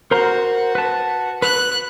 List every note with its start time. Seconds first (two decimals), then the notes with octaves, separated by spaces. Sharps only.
0.11 F#4 A#4 C5 A#5
0.75 B4 A5
1.42 B4 F#6